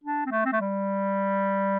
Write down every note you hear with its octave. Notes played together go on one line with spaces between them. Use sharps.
D4
C4
A3
C4
A3
G3